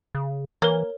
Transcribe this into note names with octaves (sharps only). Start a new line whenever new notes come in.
C#3
E3 A#3 A#4 C#5